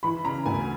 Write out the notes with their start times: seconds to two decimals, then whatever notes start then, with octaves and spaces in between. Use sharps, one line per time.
0.03 E3 B5
0.24 C#3 A#5
0.45 D2 G#5